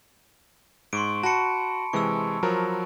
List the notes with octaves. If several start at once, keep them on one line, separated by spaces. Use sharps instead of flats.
G#2 C6 C#6 D7
F#4 A5 B5 C#7
C3 E3 G#3 C#6 E6
F3 F#3 A#4